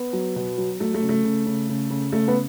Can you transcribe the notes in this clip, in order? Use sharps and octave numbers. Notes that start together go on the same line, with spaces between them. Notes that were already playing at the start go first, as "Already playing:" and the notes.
Already playing: B3
F#3
B2
F#3
F#3 A3
A3
C#3
A3
C#3
C#3
C#3
C#3
C#3 A3
B3